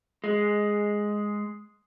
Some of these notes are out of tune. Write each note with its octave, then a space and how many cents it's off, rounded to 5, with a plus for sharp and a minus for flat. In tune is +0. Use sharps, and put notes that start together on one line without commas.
G#3 +0